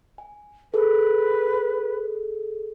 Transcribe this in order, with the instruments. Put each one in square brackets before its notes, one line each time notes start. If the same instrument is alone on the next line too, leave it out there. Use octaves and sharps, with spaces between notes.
[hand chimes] G#5
[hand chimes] G#4 A4 [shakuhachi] B4